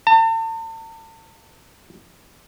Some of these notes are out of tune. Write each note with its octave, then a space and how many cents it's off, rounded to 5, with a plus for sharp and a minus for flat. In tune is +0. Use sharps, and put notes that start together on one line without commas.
A5 +40